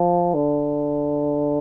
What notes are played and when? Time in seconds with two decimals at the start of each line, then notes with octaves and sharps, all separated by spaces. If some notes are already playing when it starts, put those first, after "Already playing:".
Already playing: F3
0.34 D3